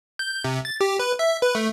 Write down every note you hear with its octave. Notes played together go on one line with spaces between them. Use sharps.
G6
C3
A6
G4
B4
E5
B4
A3